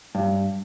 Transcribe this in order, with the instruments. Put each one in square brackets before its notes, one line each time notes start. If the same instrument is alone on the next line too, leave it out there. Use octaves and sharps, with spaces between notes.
[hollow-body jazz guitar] G2